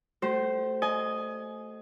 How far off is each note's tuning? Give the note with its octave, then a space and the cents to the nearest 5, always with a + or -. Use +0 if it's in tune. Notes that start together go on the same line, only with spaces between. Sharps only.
A3 +0 G4 -45 C5 +0
D#5 +0 G#5 +25